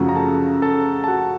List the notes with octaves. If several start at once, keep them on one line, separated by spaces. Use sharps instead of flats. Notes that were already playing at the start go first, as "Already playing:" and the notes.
Already playing: F#2 C#3 F3 A3 F#4 F#5
A#5
A4 A5
A4 A5
A5
F#4 F#5